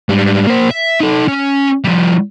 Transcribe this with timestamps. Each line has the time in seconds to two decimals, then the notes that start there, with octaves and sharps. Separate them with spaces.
0.09 G#2 G3
0.47 A#3 C5
0.71 E5
1.00 D#4 A4
1.28 C#4
1.84 F3 G3